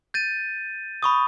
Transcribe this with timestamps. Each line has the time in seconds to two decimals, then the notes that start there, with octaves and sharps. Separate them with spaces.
0.14 G6 A6 D#7
1.03 B5 C#6 D#6